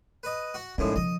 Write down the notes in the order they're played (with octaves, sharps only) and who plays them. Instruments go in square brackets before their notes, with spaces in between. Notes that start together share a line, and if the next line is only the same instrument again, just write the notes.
[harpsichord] B4 D#5
F#4 F#5
[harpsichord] A#1 A2 G#3 [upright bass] C#4 D#4
[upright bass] D3 F3 [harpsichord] D#5